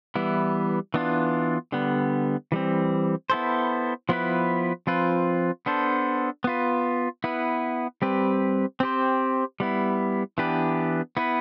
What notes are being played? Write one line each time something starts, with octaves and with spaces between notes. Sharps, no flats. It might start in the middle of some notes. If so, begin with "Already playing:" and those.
E3 G3 B3 E4
E3 B3 D4 F4
D3 G3 B3
E3 G3 C4
B3 E4 A4 C5
F3 B3 E4 B4
F3 C4 F4 B4
B3 D4 A4 C5
B3 F4 B4
B3 E4 B4
G3 C4 G4 B4
C4 G4 C5
G3 B3 E4
E3 B3 D4 G4 B4
B3 E4 B4